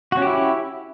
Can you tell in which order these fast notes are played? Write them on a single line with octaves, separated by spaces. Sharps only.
F#4 C#4 G4 E4